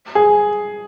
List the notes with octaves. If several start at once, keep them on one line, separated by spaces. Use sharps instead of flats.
G#4